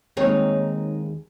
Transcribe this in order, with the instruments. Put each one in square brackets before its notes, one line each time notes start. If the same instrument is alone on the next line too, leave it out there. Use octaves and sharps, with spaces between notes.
[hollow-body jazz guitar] D#2 G#3 C4 [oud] D#4 C#5